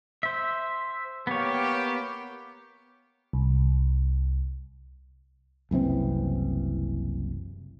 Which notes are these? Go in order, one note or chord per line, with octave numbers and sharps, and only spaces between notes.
C5 E5
A#3 B3 G4 C#5
C2
F#1 C2 E3 C4